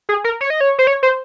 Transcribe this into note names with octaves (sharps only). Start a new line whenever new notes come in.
G#4
A#4
C#5
D#5
C#5
C5
C#5
C5